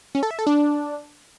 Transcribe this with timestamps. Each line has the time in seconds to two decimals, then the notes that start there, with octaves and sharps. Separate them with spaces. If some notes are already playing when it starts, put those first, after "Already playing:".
0.15 C#4
0.23 A4
0.31 E5
0.39 A4
0.47 D4